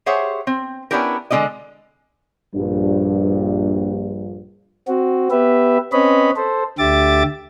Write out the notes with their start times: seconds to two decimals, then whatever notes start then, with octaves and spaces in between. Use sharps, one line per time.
0.06 G4 G#4 C5 C#5 E5 F#5
0.47 C4
0.91 B3 C#4 D4 E4 G4 A#4
1.30 D3 G#3 E4 D5 D#5
2.54 A#1 G2
4.88 C4 F#4
5.31 B3 G4 B4 E5
5.93 C4 C#4 B4 C#5 D#5 B5
6.36 A4 C5
6.79 D2 D3 G4 E5 D6 A6